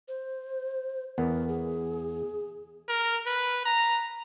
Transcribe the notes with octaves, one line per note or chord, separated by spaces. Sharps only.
C5
E2 B3 A#4
G#4
A#4
B4
A#5